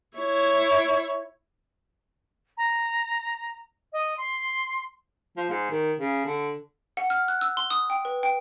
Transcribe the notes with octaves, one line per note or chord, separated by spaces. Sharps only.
E4 C#5
A#5
D#5
C6
F3
G#2
D#3
C#3
D3
F#5
F6
F#6
E6
C6
D#6
G5
B4
G5